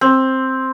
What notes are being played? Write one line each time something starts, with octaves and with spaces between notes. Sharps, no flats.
C4